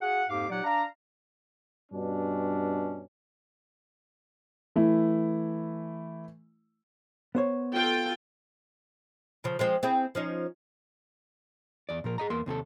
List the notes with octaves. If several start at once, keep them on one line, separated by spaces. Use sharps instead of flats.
F#4 G#4 F5 F#5
F2 G#2 A#3 G4 F5 D6
A#2 F#3 D#4 G4 D5 F#5
D4 D5 F5 A#5
G2 B2 C#4 D4
E3 A3 E4
B3 C5 C#5
F4 A4 G5
C#3 F3
F3 G#3 C4
C4 E4 G#4
F3 C#4 D#4
E2 D5
A#2 F3 A#4
G#4 D#5 A#5
E2 A#3 C6
D#2 C3 G#4 A4